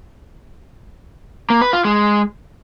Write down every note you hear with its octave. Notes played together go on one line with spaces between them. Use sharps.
A#3
B4
F4
G#3